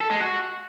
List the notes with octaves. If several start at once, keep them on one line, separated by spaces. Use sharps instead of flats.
A4
G#3
F#4